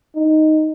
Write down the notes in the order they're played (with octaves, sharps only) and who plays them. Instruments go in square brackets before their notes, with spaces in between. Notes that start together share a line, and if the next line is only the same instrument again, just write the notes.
[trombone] D#4